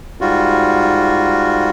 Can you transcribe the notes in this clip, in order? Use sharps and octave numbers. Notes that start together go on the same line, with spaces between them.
G#2 G3 F4 F#4